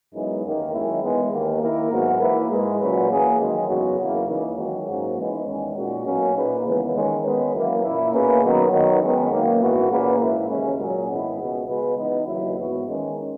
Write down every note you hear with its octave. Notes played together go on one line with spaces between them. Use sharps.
F#2 E3 G#3 B3 D#4
D#2 D#3 A#3 D#4
F#2 D#3 G#3 C#4 E4
E3 G#3 B3
D#2 D#3 A#3
D#3 A#3 E4 A#4
G#2 F#3 B3 F#4 A#4
E3 A#3 E4 B4
G#2 E3 G#3
A#2 F#3 C#4 F#4 B4
E3 A#3 C#4 G#4
F#2 D#3 G#3
E2 C#3 F#3 B3 F#4
E2 C#3 F#3 A#3 E4
C#2 C#3 E3 A#3 D#4
F#2 D#3 G#3 C#4 F#4
G#2 F#3 A#3 C#4 F#4
E3 G#3 B3 D#4
E2 D#3 G#3 C#4
A#2 G#3 D#4 F#4
B2 F#3 A#3 C#4
A#2 A#3 D#4 G#4 B4
D#2 C#3 E3 G#3 B3
D#3 G#3 C#4
D#3 G#3 B3
F#2 E3 A#3 E4
A#2 A#3 E4
B2 A#3 C#4 G#4 B4
D#3 F#3 B3 D#4
D#3 F#3 B3 D#4
F#2 D#3 G#3 B3
F#2 D#3 A#3
G#2 E3 B3 F#4
A#2 A#3 C#4 G#4 B4
G#2 E3 A#3 E4
D#2 C#3 G#3 C#4
A#2 F#3 C#4 G#4
G#2 D#3 G#3 B3 E4
C#2 B2 G#3 B3
C#3 G#3 B3 F#4 B4
E3 B3 D#4
D#2 C#3 F#3 A#3 E4
G#2 E3 B3 F#4
D#3 G#3 C#4